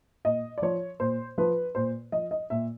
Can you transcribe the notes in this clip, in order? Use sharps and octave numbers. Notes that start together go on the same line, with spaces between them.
A#2 D#5
D5
F3 C#5
A#2 C5
F3 B4
A#2 C5
F3 D#5
D#5
A#2 E5